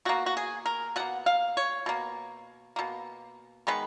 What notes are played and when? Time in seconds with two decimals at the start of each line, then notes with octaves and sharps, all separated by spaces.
0.05 B2 A#3 F#4
0.26 F#4
0.37 G#4
0.66 A#4
0.96 B2 A#3 F#5
1.26 F5
1.57 C#5
1.86 B2 A#3
2.76 B2 A#3
3.67 D#3 G#3 B3 B4